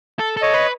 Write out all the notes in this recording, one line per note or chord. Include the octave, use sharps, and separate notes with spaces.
A4
A4
C#5 D#5
B4